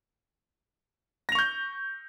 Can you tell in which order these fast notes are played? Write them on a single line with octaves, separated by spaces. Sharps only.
A#6 F7 C#6 G6